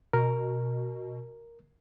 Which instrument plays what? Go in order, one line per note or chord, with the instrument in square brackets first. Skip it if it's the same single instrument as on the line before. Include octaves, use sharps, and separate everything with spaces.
[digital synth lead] B2 [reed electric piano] A#4